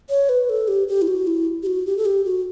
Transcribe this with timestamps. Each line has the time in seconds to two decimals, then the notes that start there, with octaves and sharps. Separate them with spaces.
0.10 C#5
0.29 B4
0.49 A4
0.68 G4
0.88 G4
1.02 E4
1.07 F#4
1.27 E4
1.63 G4
1.66 F#4
1.86 G4
1.97 A4
2.05 G4
2.25 F#4